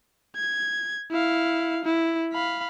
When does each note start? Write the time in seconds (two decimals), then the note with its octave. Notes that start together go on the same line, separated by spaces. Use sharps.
0.36 G#6
1.11 E4 F5
1.85 E4
2.33 F5 B5